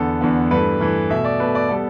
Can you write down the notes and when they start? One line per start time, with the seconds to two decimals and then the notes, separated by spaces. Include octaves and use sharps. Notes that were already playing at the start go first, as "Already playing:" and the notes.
Already playing: E2 D3 B3 A4
0.21 E2 D3 B3
0.51 G2 E3 A3 B4
0.80 G2 E3 A3
1.10 B2 A3 E5
1.24 D5
1.40 B2 A3 B4
1.55 D5
1.69 G3 B3 A4